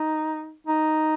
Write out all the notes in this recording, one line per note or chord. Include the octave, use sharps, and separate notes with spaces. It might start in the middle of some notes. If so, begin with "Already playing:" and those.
Already playing: D#4
D#4